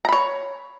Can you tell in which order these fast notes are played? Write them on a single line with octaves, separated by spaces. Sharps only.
A#5 B5 C#5